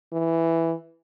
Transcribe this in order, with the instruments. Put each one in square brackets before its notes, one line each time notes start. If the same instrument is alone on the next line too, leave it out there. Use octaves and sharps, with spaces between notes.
[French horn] E3